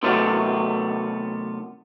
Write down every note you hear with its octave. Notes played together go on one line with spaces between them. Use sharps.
C3 D#3 F#3 A3 B3